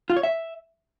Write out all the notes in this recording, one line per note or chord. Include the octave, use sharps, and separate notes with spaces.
F4
C#5
E5